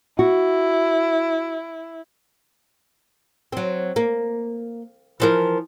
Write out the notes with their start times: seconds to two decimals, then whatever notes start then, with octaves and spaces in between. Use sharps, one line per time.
0.19 E4 F#4
3.52 F#3 C4
3.96 A#3
5.20 E3 F3 A#4